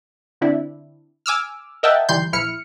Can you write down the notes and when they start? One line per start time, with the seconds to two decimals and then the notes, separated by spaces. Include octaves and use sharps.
0.41 D3 C4 D4 E4
1.26 G#5 D6 E6 F6
1.83 A#4 D#5 E5 F#5 G5 A5
2.09 G1 D#3 E3 G3 C6 G6
2.33 A#1 F3 E4 F6 C#7